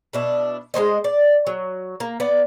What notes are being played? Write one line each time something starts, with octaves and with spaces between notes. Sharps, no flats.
B2 D4 E4
G#3 A#3 C5 D#5
D5
F#3
A#3
B3 D5